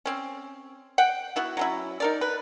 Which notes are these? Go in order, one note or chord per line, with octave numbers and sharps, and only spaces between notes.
C4 C#4
F#5 G5
B3 E4 F#4
F#3 C#4 E4
D#4 A#4 D5
B4